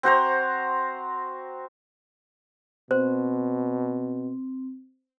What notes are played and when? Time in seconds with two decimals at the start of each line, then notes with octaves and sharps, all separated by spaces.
0.03 C4 F#4 C5 A#5
2.91 B2 C4 C5